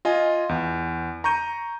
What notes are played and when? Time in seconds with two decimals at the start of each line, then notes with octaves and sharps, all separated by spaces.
0.05 F4 D#5 G#5
0.49 E2
1.24 A#5 C#6 G6 D#7